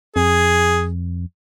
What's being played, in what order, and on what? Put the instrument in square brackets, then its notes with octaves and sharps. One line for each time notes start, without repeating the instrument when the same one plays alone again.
[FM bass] F2 [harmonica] G#4